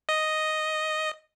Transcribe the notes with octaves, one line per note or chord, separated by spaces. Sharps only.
D#5